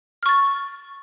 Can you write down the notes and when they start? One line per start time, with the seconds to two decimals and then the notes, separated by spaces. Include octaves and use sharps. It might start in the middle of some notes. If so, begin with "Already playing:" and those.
0.23 F6
0.26 C#6
0.29 A6